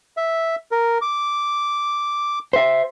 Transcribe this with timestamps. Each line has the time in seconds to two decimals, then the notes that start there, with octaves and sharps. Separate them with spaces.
0.17 E5
0.71 A#4
1.01 D6
2.53 C5 E5